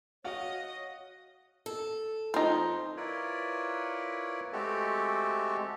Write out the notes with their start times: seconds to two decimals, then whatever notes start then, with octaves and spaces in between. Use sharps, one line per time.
0.24 F#4 C#5 D#5 F5 F#5
1.66 A4
2.34 F2 D#4 C5
2.97 E4 F4 A#4 B4 C#5 D5
4.53 G#3 A3 C4 F#4 G4 A4